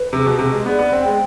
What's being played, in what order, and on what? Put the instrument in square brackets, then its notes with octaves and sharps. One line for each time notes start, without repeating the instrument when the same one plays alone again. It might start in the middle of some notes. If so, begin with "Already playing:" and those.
Already playing: [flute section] B4
[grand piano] C3 [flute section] G#4
[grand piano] B2
[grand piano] C3 [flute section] G#4
[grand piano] G#3
[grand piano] B3 [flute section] D5
[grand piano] B3
[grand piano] C4 [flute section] G5
[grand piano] G#3